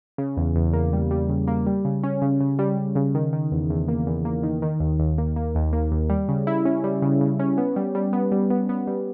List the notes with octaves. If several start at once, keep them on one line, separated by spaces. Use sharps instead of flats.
C#3
E2
E2
A#3
G3
G3
C#3
A#3
G3
C#3
C#4
C#3
C#3
G3
G3
C#3
D#3
D#3
E2
E2
A#3
E2
A#3
D#3
D#3
D#2
D#2
A#3
A#3
D#2
A#3
D#2
G3
C#3
E4
C#4
G3
C#3
C#3
C#4
B3
G3
G3
B3
G3
B3
B3
G3